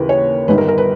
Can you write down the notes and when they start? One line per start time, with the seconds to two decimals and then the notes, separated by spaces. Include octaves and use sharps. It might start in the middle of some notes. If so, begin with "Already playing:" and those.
Already playing: D#2 C#3 E3 A#4 B4
0.09 C#5
0.48 G1 G2 D#3 B4
0.58 A#4
0.68 A#4
0.78 B4